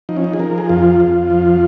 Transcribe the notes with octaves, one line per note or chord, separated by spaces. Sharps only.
F3 D#4
C#4
D#4
G#4
F3 A#4
G#4
F2 F4
F2
F3